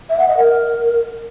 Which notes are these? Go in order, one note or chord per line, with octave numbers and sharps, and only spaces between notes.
E5
F#5
D#5
A#4